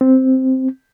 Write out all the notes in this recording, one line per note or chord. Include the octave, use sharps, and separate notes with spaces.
C4